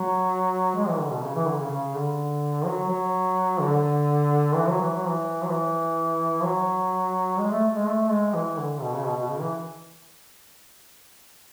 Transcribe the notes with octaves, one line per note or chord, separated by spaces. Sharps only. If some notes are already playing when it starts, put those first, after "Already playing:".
Already playing: F#3
G#3
E3
D3
B2
C#3
E3
D3
C#3
C#3
D3
F#3
F#3
D3
E3
F#3
E3
F#3
E3
F#3
E3
F#3
G#3
A3
G#3
A3
G#3
E3
D3
B2
C#3
B2
B2
C#3
E3